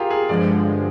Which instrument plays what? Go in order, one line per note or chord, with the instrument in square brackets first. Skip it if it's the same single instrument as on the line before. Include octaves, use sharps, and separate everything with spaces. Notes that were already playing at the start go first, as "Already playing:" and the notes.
Already playing: [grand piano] F4 G4 G#4 A#4
G#4
[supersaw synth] G2 D3 F3 G#3 [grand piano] D5